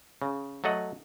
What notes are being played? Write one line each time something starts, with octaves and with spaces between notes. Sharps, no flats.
C#3
F#3 A3 A4 D#5 F#5